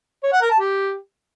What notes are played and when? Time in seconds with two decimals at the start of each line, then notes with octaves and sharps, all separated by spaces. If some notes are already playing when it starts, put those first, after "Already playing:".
0.23 C#5
0.32 F#5
0.41 A#4
0.50 A5
0.59 G4